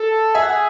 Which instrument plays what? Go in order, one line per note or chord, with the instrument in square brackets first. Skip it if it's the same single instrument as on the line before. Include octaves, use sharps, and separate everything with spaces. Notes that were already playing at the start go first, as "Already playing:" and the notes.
Already playing: [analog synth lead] A4
[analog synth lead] G#4 [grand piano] E5
[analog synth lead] F#4
G#4